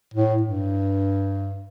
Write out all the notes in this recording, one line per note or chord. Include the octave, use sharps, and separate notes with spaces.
A2
G2